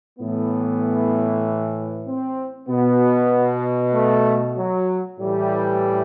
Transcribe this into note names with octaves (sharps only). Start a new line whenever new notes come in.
A2 E3 B3
C4
B2 B3
A3
F#3
A2 E3 G3